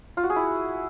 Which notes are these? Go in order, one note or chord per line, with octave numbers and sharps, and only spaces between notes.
F4
F#4
G#4
E4